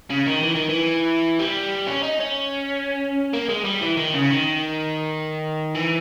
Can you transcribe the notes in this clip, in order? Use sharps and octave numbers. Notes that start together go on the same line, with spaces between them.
C#3
D#3
E3
D#3
E3
G3
C#4
D#4
C#4
A#3
G#3
G3
E3
D#3
C#3
D#3
E3